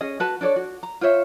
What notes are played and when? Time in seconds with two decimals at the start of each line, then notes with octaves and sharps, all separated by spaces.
0.01 C#4 G#4 D#5
0.20 F#4 B4 A5
0.41 D4 A4 C#5 D5
0.56 F#4
0.83 A#5
1.01 F4 C5 C#5 E5